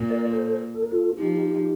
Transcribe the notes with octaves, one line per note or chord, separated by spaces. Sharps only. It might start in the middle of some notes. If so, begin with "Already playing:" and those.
Already playing: A#2
A#4 D5
A4 C5
A4
A#4
F4 A4
F3 D#4 G4